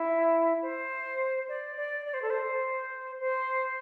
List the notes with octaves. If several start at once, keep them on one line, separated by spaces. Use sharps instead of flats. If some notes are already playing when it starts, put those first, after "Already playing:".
Already playing: E4
C5
D5
D5
D5
C5
A4
C5
C5